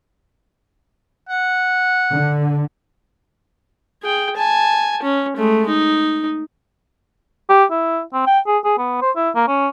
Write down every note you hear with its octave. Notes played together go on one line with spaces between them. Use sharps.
F#5
D3
G#4 G5
G#5 A5
C#4
G#3 A3
D#4
G4
E4
C4
G5
G#4
G#4
B3
C5
E4
A#3
C#4